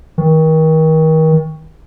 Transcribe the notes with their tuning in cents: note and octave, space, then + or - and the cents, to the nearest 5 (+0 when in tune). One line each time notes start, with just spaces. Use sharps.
D#3 +35